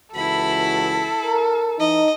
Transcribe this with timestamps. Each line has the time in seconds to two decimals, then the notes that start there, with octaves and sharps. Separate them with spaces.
0.15 C#2 E3 E4 F#4 A4 B5
1.24 A#4
1.80 E3 D#4 D#5